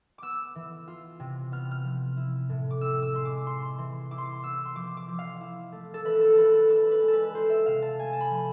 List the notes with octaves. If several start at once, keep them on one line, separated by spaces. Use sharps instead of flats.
B3 D6 E6
E3
F4
C3
B3 F6
F6
F3
E4
A2
D6
C4 E6
E6
G#3 C6
D6
F4 C6
C6
E3 C6
E4 D6
C6
D6
B3 E6
C6
F3 D6
D6
F3
F5
E4
A3
A4
E3 B4
A4
E3 A4 B4
A4
D4 B4
B4
G#3
A4
B4
F4 C5
E5
C3 F5
A5
A3 G#5
A5
B5
F3